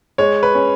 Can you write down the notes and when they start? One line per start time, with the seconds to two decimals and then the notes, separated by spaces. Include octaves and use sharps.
0.18 G#3 C#5
0.43 B4
0.55 C#4